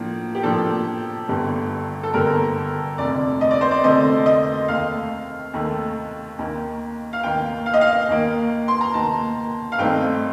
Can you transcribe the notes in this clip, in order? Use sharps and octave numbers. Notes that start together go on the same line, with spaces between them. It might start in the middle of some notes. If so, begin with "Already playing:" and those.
Already playing: A2 F3 A#3 D4
G4
A2 F3 A#3 D4 A4
G1 G2 D3 G3
A4
G1 G2 D3 G3 A#4
F1 F2 D3 A3 D5
D#5
D5
C5
D5
F1 F2 D3 A3 D#5
D#5
D#2 D#3 A3 F5
D#2 D#3 A3
D#2 D#3 A#3
F5
D#2 D#3 A#3 G5
F5
D#5
F5
D#2 D#3 A#3
C6
A#5
D#2 D#3 A#3 A5
F5
G2 D#3 A3 C4 D#4 G5